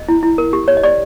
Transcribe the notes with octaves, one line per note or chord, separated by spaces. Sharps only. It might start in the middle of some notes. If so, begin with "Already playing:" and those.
Already playing: D#5
E4
E4
A#4
G4
C#5
D#5
G4 D5